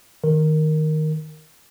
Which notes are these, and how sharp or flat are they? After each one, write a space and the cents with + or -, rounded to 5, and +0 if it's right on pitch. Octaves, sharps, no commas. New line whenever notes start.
D#3 +0 A#4 +0